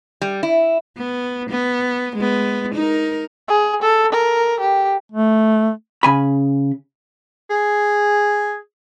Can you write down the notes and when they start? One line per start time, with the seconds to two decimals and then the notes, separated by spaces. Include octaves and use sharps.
0.21 G3
0.43 E4
0.97 B3
1.49 B3
2.16 G#3 B3
2.74 D#4 A#4
3.48 G#4
3.82 A4
4.13 A#4
4.60 G4
5.12 A3
6.03 C#3 G#5 B5
7.50 G#4